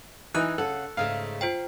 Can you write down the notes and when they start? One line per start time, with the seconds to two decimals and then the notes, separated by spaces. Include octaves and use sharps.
0.35 E3 D#4 G#5 F#6
0.58 C#3 A4 F#5
0.97 G#2 C#3 A3 F5
1.41 F4 C5 G5